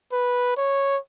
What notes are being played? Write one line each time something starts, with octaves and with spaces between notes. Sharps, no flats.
B4
C#5